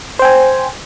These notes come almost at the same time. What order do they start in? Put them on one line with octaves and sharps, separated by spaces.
C5 G5 G#5